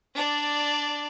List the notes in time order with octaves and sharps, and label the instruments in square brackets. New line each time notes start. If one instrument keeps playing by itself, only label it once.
[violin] D4 D5